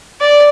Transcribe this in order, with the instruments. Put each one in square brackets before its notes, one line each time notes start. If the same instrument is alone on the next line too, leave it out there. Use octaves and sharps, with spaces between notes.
[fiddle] D5